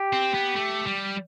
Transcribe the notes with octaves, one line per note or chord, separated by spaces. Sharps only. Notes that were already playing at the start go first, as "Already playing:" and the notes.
Already playing: G4
C4
B3
A3
G3